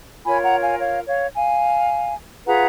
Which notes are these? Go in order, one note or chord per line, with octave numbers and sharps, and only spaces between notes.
F4 A#4 C#5 G#5 B5
F#5 A#5
F5 G#5
C#5 F5
C#5 F5
F5 G#5
F4 G#4 B4 F#5 A#5